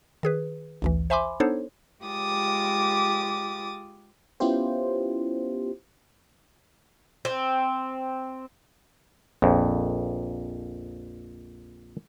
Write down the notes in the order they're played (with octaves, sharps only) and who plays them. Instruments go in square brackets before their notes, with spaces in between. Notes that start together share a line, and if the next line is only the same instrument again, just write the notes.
[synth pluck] D#3 G#4 B4
A1 D2 E3
C5 E5 G#5 B5 C6 D6
B3 D4 D#4 A4 C5 C#5
[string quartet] G#3 F4 G4 D6 D#6 A6
[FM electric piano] B3 C#4 E4 F4 G4 C5
[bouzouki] C4
[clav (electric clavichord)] A#1 F2